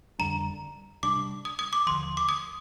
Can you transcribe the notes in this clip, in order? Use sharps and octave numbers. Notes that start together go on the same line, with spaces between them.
F2 D3 G3 D4 A#5
C3 G3 D4 D6
D#6
D#6
D6
D#2 D3 F3 C6
D6
D#6